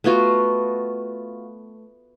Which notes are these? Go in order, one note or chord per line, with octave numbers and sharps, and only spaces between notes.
A3 B3 F4 F#4